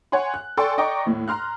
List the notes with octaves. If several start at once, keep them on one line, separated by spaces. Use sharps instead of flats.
C#5 F#5 G#5 C6
F#6
A4 D5 G5 G#5 C6 C#6
D5 D#5 G5 A#5 C#6 D6
D#2 A2
A#5 C6 F6 F#6